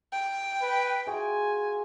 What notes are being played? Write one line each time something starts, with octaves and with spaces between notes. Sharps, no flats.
G5
B4
F4 F#4 G#4 G#5